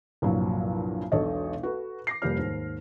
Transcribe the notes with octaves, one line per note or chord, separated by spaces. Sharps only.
C2 G2 A#2 F3 F#3
E1 B1 D4 A4 C#5 D#5
F#4 A4 B4
D6 A#6 C7
F1 G3 A#3 G4 D5 F6
D#2 G#2